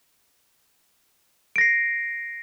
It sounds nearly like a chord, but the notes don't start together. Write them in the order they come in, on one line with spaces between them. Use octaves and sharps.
D7 A#6 C7